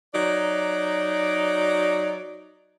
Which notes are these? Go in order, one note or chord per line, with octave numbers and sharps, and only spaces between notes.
F#3 D#4 D5